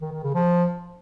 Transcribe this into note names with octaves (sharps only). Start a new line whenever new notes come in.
D#3
D#3
C#3
F3